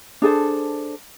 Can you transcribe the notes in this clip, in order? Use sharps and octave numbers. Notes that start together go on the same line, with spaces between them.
D4 G#4 A4 C5